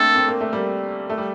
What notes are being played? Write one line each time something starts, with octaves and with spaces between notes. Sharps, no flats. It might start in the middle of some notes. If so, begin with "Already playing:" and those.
Already playing: A3 A#3 C4 D4 A4
C4
A#3
A3
G3 A#3
A3
G3